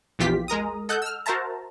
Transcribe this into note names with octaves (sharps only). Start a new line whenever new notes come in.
A#1 E2 E3 F4 G4 B6
G#3 A#4 A#5 D#6
A4 D#5 F#5 F#6 G6
E6 F6
F#4 A#4 C5 E5 A5 A#5